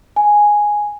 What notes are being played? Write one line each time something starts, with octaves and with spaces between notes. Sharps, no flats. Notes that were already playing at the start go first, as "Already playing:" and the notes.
G#5